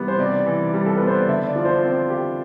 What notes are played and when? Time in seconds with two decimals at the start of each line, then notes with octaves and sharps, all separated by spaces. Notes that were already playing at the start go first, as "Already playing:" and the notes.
Already playing: C3 E3 G3 B3
0.08 C5
0.19 C3 D5
0.46 E3
0.74 G3
0.86 A4
0.98 B3 B4
1.07 C5
1.18 D5
1.28 D3 E5
1.47 D5
1.56 F3
1.65 C5
1.84 C4
2.10 G4